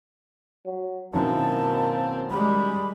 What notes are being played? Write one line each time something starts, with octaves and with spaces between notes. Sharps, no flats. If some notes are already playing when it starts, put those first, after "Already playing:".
F#3
F#2 B2 D#3 A#3 C4 E4 A5
G3 G#3 B5